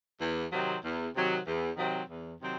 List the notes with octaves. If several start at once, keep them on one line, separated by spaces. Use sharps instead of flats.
E2
C3 D#3 F#3 C4
E2
C3 D#3 F#3 C4
E2
C3 D#3 F#3 C4
E2
C3 D#3 F#3 C4